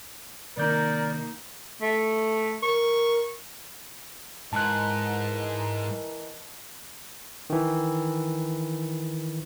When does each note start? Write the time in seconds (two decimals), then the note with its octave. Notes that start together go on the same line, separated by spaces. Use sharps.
0.57 C3 D#3 A#3 D#4 A#4 D5 G6
1.82 A3
2.63 A#4 C#6
4.53 G#2 E3 A#4 D#5 A5 F#6
7.50 D#3 E3